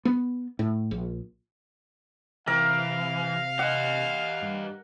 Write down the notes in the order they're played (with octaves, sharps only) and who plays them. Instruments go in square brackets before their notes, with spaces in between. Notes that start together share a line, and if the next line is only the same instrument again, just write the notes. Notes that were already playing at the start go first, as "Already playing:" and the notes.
[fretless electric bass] B3
A2
A#1
[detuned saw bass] C3 [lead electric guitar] E3 [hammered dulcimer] A#4 [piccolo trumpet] F5
[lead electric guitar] G4 D#5 [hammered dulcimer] F#5
[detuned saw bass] G2